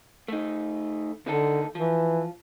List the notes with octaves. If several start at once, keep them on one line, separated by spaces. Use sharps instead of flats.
A3 D#4
D#2 D3 D#4 A4
E3 F3